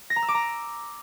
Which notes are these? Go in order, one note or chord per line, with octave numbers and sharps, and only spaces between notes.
A#6
A#5
E6
D6
A#5